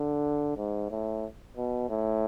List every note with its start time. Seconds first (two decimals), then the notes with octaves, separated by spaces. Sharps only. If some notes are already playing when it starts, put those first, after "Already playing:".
Already playing: D3
0.57 G#2
0.91 A2
1.57 B2
1.90 A2